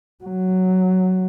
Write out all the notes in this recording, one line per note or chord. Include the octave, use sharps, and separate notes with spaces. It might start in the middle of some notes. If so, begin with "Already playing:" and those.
F#3